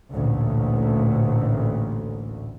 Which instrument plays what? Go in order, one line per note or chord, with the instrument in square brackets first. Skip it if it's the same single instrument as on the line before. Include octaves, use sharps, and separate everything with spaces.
[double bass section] A1 D2 A#2